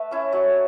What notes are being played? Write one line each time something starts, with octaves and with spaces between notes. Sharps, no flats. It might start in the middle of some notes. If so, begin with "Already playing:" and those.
Already playing: A3 B4 E5
C#4 E4
F#3 E5